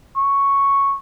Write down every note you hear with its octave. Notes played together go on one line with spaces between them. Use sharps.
C#6